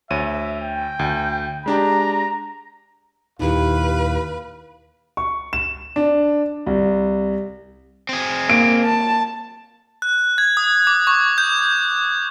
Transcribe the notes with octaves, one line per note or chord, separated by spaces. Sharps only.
D2 C#5 E5 D#7
G5
D2
G#3 D4 G4 A#5
D#2 A#2 D#4 E4 G4 B4 F5
C#6
E7
D4
C2
C4 G#4
A#3 D7
A5
F#6
G#6
D#6
D6
C#6
G6